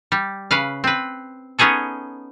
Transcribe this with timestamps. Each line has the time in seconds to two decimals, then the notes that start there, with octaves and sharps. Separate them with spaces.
0.12 G3
0.51 C#3 B4 F5
0.84 C4 B4
1.59 B3 C#4 D#4 G#4 A4